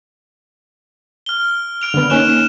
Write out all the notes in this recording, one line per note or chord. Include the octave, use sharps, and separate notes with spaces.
F6 G7
F6 D7 F7
D3 B3
A#3 C#4 D#4 F#6 E7 G7
E7